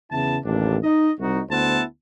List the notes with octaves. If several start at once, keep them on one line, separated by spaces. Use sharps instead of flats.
E2 C#3 B3 E4 A5
A1 D#2 D4
D#4 D#5
C2 D#4 F#4
D2 B3 E4 C5 F#5 A5